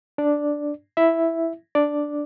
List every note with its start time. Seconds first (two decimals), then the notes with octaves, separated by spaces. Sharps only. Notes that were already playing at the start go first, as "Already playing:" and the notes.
0.18 D4 D5
0.97 E4 E5
1.75 D4 D5